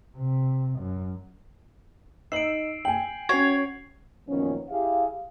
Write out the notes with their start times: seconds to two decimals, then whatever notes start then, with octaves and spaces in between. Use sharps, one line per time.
0.17 C3
0.80 F#2
2.32 D#4 E6 C7 D7 F#7
2.85 G5 G#5 F#7
3.29 C#4 F#4 C#5 G#6 C7 F7
4.27 F#2 A#2 D#3 F3 B3 C#4
4.69 E4 G4 G#4 E5 F5